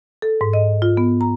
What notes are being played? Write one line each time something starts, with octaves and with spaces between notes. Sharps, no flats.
A4
G#2
D#5
F4
B3
A#5